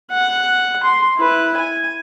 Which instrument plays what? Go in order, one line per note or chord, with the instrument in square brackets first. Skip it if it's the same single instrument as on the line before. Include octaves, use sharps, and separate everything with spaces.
[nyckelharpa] F#5
C6
E4 B4
G#5